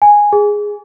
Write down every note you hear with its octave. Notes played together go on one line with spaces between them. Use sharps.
G#5
G#4